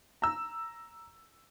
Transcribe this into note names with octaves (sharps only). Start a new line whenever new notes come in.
A#5 E6